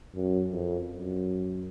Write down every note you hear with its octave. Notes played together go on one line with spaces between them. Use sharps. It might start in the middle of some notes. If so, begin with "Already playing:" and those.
F#2
F2
F#2